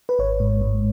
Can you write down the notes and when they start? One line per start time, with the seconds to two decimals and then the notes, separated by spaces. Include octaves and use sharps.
0.09 B4
0.19 G#1 C#5
0.40 G#2
0.62 G#2